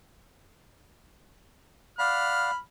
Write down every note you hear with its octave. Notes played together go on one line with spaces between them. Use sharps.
D5 F5 F#5 B5 F6